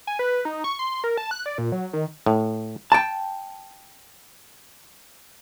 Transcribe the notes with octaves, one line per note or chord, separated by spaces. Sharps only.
G#5
B4
D#4
C#6
C6
A#4
A5
F#6
D5
A#2
F#3
D#3
A2
G5 A5